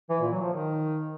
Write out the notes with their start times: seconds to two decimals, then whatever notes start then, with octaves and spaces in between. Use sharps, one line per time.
0.10 E3
0.21 A#2
0.31 F#3
0.42 F3
0.53 D#3